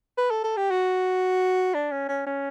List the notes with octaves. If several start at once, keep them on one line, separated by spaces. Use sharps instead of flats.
B4
A4
A4
G4
F#4
D4
C#4
C#4
C#4